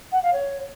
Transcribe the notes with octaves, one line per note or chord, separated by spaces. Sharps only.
F#5
F5
C#5